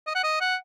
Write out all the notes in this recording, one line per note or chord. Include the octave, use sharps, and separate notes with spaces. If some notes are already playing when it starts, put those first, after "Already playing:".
D#5
F#5
D#5
F#5